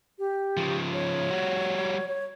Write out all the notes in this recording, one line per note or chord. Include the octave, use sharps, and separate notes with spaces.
G4
C#3 F3
C#5
G3 F#4
C#5